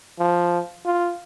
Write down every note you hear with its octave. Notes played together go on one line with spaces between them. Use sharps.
F3
F4